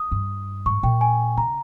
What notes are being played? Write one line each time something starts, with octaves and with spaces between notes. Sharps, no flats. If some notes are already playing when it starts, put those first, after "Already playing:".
Already playing: D#6
G2
G#2 C#6
A#2 G5
G#5
C#3 A#5